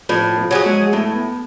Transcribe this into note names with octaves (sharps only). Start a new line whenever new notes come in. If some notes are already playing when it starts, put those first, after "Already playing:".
A2 F3
F3
F#3 C#4 G#4
G#3
A2 A3
B3